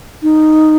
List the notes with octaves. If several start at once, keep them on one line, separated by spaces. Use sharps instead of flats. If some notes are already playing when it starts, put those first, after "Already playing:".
D#4